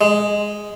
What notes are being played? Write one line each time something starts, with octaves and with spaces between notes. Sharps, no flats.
G#3